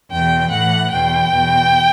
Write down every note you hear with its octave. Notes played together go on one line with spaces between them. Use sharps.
E2 B2 G5
A2 E3 F#5
E2 B2 G5
E2 B2